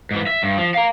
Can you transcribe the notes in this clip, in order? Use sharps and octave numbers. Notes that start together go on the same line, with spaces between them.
G#2 E3
E5
G2
F3
F5 A#5